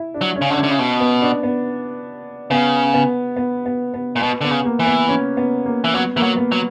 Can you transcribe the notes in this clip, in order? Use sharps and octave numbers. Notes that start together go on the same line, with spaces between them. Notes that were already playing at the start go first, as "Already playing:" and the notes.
Already playing: E4
D4
F#3
C#4
C#3
D3
C#4
D3
C#3
B2
B3
D4
B3
C#3 B3
B3
B3
B3
B3
A#2
B2 B3
D3 B3
C#3
A#3
E3
B3
C#4
B3
A#3
E3
F#3 B3
E3 A#3
F#3
B3
F#3